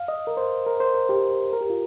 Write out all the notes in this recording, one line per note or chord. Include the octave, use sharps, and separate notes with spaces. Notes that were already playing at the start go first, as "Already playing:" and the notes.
Already playing: F5
D#5
A#4
C5
A#4
C5
A#4
G4
A#4
G4
F4